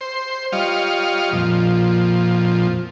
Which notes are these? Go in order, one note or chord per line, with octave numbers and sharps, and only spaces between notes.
C5
G3 F4 C#5 D#5 F5
F2 A#2 F3